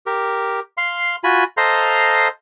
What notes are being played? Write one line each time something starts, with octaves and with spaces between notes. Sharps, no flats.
G4 A#4
F5 C6
F4 F#4 G#5 B5
A4 C5 D#5 F5 A#5 C6